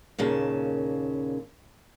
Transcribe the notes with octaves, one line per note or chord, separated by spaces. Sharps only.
D#2 A#2 C#3 A5